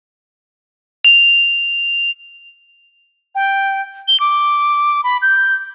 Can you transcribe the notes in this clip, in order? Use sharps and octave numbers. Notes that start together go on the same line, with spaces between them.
F7
G5
G7
D6
B5
G6